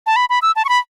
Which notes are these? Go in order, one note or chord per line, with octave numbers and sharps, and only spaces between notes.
A5
B5
B5
E6
A5
C#6
B5